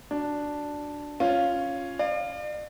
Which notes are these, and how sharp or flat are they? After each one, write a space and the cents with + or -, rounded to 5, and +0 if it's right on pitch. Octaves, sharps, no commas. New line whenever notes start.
D4 +0 F#4 +0
C#4 +0 F4 +0
D5 +40 F5 +0